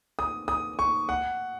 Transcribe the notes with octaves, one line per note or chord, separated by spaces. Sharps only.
D#6
D#6
C#6
F#5